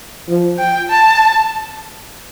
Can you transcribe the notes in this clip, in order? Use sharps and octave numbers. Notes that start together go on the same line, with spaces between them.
F3
G5
A5